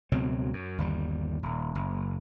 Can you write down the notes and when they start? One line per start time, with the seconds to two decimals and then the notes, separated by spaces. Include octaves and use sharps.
0.12 C#2 B2 F#3 C4
0.53 F#2
0.78 G1 D#2 G3
1.43 D#1
1.75 F#1